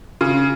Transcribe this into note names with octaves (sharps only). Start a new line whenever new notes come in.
C#3